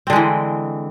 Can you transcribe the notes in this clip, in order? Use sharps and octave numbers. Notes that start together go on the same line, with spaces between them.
D3 E3 G#3 C4